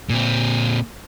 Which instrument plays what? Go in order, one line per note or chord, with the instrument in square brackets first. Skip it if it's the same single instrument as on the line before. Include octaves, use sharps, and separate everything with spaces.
[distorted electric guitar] A#2 C4